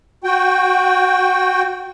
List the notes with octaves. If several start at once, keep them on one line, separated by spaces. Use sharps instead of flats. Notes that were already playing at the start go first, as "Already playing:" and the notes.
F#4 G5